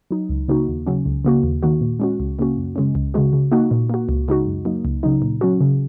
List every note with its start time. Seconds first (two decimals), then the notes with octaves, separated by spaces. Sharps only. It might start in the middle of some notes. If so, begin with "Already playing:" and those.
0.11 F#3 D#4
0.29 C#2
0.48 C#3 A#3 D#4 F#4
0.68 D#2
0.86 C#3 F#3 C#4
1.06 C#2
1.25 C#3 A#3 F#4
1.43 D#2
1.63 D#3 A#3 F#4
1.81 A#2
2.00 G#3 C#4 F#4
2.20 C#2
2.39 C#3 A#3 C#4 F#4
2.57 F#2
2.76 C#3 G#3 C#4
2.95 C#2
3.14 C#3 G#3 F#4
3.33 C#3
3.52 A#3 D#4 F#4
3.71 A#2
3.90 A#3 F#4
4.09 C#2
4.28 C#3 G#3 D#4 F#4
4.47 F#2
4.65 F#3 A#3 D#4
4.85 C#2
5.03 C#3 F#3 D#4
5.22 A#2
5.41 F#3 C#4 F#4
5.61 C#3